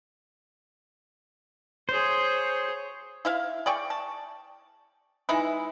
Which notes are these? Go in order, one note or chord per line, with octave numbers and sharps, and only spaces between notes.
G#4 C5 C#5
E4 E5 F5
G#4 D5 G5 C#6
A5
E3 G#3 D#4 E4